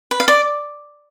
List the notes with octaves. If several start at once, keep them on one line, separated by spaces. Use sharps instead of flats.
B4
F5
D5